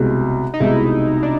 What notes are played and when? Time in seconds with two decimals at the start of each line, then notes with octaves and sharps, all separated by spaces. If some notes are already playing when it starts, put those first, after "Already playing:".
Already playing: C2 B2 G#3
0.54 D#4
0.60 C2 B2 G#3 E4
1.23 D4